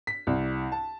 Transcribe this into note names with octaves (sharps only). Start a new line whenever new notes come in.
B6
C2
A5